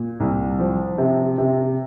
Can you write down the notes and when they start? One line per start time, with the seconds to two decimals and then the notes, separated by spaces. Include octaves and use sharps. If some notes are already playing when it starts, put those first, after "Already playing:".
Already playing: A#2
0.20 C2
0.59 F3
0.98 C3
1.38 C3